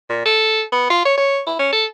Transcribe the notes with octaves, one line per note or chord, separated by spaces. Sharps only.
A#2
A4
B3
F4
C#5
C#5
E4
C#4
A4